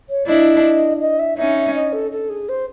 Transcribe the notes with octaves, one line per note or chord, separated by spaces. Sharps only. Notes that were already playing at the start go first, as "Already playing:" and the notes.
C#5
D4 E4 D#5
D#5
E5
C#4 D#4 E5
D#5
A4
A4
G#4
C5